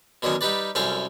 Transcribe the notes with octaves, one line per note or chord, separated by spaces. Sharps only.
B2 D3 D#3 F#3 C#4
G3 D#4 G4 B4 D5
C2 F#2 C#4 A4 F5 G5